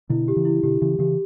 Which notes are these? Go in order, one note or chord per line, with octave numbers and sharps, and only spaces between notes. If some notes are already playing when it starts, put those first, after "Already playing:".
B2 D3 E4
G4
C#3 E3
E4
B2 D3 G4
C#3 E3 G4
C#3 E3 G4